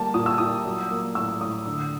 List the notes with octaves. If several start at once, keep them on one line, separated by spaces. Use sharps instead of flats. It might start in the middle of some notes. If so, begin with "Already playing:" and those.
Already playing: G3 A#3 A5
A#2 D#6
E6
A#2 D#6
F#3
A#3
A2 E6
A2 D#6
D3